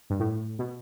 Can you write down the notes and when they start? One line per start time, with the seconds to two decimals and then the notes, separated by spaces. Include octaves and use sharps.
0.10 G2
0.19 A2
0.59 B2